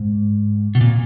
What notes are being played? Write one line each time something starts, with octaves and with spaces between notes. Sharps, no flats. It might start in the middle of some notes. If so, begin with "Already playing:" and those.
Already playing: G#2
B2
A#2